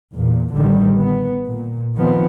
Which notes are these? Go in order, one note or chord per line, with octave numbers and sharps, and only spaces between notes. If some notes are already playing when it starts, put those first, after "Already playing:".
E2 A#2
A1 D3 D#3 G3
B3
A#2
D#3 F3 B3 C4